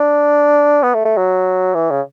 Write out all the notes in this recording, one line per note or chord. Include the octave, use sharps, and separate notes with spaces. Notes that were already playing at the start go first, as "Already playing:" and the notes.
Already playing: D4
B3
A3
A3
F#3
E3
C#3